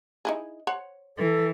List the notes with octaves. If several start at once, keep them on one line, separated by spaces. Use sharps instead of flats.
D#4 E4 G#4
C5 C#5 F#5
E3 A4